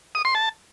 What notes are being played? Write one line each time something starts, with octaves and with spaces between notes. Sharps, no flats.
D#6
C6
A5